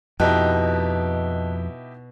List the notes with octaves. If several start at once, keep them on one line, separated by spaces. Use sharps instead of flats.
F2 B2 D#4 E4 G4 D#5 A5 F#6